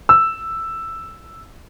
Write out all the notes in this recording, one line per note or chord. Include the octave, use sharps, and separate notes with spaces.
E6